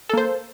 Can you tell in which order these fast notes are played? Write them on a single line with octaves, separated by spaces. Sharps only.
A4 A#3 C5